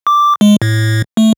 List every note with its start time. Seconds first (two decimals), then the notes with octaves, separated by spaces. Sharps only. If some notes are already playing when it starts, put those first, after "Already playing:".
0.07 D6
0.41 G#3
0.62 A2
1.17 A3